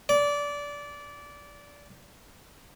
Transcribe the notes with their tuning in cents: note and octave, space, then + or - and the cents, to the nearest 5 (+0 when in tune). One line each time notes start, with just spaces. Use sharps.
D5 -20